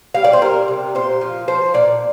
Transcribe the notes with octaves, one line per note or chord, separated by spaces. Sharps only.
G3 F5
D5
C5
G3 A#4
C3
A#2 C5
F3
F3 C5
A#2 D5